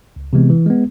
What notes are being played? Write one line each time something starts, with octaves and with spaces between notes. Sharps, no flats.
C#2
C3 E3 G#3 B3
E3
G#3 B3